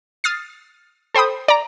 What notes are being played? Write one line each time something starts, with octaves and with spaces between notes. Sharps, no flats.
D#6 F6 A6 C7
A4 C5 G5 B5 D#6
D5 A#5